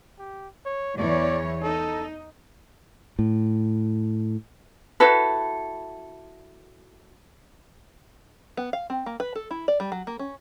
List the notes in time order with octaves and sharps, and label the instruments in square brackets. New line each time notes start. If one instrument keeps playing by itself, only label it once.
[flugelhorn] G4
C#5
[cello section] E2 E3 C#5 [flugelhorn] D5
[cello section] D#4 [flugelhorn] A4
[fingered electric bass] A2
[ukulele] E4 F#4 A4 B4
[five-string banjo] B3
F5
C4
A#3
B4
A4
E4
D5
G3
F#3
A#3
C#4